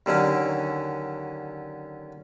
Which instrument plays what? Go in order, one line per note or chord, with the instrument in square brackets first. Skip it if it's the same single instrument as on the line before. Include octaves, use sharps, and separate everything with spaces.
[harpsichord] D#2 D3 F#3 C#4